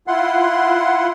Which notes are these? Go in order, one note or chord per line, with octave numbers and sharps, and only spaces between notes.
E4 F4 F#5 C6